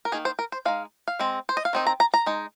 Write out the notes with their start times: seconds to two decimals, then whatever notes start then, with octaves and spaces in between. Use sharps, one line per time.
0.05 A#4
0.12 D#3 A#3 D#4 G#4
0.25 C5
0.39 A#4
0.52 C5
0.65 G#3 D#4 F5
1.08 F5
1.19 G#3 C4
1.49 C5
1.57 D#5
1.65 F5
1.73 D#3 C4 D#4
1.87 A#5
2.00 A#5
2.14 A#5
2.26 G#3 D#4